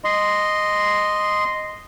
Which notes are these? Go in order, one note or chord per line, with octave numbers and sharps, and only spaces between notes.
D#5 C6